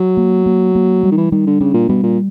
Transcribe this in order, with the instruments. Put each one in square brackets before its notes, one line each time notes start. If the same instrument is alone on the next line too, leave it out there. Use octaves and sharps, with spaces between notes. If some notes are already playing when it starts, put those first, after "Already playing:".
Already playing: [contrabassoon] F#3
[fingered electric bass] A#3
A#3
A#3
G3
[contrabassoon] D#3
E3
[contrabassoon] D#3 [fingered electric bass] G3
[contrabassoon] D3
[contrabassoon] C#3 [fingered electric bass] D4
[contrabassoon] A#2
[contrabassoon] B2 [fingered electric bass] G3
[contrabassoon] A#2